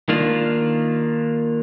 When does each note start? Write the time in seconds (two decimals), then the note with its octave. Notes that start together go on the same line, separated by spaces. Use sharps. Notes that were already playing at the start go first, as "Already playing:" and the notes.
0.09 D#3 A#3 D4 F4